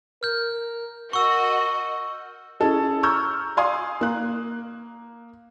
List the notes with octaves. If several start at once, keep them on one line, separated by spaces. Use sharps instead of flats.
A#4 F6 G6
F#4 A#4 D#5 C#6 E6
C#4 E4 G#4 A4 D#5
A#5 C#6 E6 F6 G6
D5 F5 G#5 C6 D#6
A#3 F#6